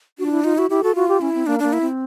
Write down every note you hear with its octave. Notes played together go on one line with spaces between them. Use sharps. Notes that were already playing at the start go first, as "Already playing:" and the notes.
D4 F#4
F4
E4
D#4 F4
E4 F#4
E4 G4
F#4 A4
F4 F#4
G4
C#4 E4
C4
A#3 D4
A#3 D4
E4
C4